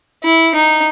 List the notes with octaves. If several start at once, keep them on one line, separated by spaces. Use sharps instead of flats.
E4
D#4